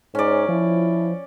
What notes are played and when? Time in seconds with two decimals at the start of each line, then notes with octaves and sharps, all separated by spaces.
0.15 G#2 C#4 D5
0.49 F3 E4